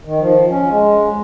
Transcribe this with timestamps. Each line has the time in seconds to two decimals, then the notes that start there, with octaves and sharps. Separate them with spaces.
0.05 D#3
0.19 F3
0.50 C#4
0.69 G#3